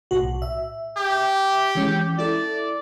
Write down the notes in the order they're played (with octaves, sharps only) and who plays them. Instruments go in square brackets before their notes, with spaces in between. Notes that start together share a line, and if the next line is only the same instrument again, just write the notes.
[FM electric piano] B1 A2 F#4
E5
[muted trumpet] G4
[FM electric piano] E3 G#3 C#4
[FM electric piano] E4 A4 [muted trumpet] D5